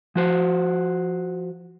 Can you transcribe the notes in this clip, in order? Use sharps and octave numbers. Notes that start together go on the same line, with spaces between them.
F3 F#4 C5